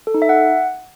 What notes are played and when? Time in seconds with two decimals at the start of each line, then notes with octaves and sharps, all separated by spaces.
0.07 A4
0.14 D#4
0.22 E5
0.29 F#5